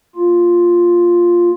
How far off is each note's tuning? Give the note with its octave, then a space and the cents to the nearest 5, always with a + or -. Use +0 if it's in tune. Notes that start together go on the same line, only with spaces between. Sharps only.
A#3 +0 F4 +0